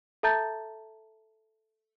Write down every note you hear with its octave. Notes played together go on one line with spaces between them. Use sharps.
A4 E5 A5 A#5 G6 A6